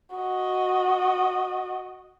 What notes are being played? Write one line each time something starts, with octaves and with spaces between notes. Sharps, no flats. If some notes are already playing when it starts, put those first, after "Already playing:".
F#4 D#5